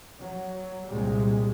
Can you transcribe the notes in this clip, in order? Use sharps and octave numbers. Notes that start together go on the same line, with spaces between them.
F#3
C2 A#2 G3 G#3